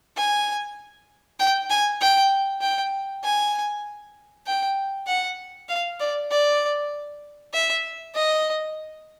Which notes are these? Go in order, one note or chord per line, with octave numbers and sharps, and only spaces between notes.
G#5
G5
G#5
G5
G5
G#5
G5
F#5
F5
D5
D5
E5
D#5